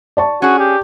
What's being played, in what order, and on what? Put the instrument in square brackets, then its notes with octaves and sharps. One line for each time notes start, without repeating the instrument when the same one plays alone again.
[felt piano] D5 A5 C#6
[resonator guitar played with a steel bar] C#4 G#4 [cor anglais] F#4
[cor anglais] G4